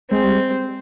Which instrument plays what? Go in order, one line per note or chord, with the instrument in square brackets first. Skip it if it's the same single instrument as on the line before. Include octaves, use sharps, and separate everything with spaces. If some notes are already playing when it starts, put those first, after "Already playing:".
[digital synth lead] G#3 [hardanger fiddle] C4
[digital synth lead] G3